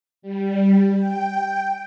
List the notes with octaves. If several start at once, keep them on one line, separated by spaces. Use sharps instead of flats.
G3
G5